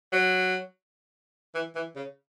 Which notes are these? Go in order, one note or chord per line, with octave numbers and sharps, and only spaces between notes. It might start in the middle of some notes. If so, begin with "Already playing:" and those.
F#3
E3
E3
C#3